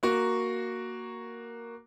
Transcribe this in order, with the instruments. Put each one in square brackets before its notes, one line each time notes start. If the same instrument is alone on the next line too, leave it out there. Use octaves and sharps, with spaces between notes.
[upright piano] A#3 F#4